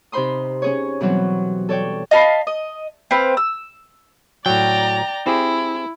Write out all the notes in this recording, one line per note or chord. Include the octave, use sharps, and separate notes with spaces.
C3 D#4 C5 B5 C6 D#6
C#4 G#4 C#5
B2 E3 F#3 G3 C4
A4 C#5 D5 G5
D#5 F5 A5 B5
D#5
C4 B4 C5 F5
E6
A2 F#3 D5 G5 A#5
C4 E4 G4 G#4